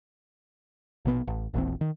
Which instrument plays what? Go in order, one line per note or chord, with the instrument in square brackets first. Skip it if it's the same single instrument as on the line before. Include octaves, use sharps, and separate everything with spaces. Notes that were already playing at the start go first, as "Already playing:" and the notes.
[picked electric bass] A#1 B2 B3
A1
E1 A#1 E2 C4
D#3